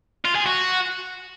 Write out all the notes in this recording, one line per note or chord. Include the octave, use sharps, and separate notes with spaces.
F4
G#4
F#4